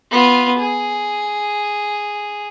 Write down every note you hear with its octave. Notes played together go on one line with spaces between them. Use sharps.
B3 F4
G#4